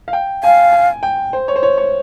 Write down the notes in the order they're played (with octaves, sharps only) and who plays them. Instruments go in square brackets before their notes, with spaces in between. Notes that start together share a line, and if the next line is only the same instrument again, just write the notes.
[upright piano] F5
G5
[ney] F5 [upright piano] G#5
[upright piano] G#5
G5
C5
C#5
C5
C#5
C#5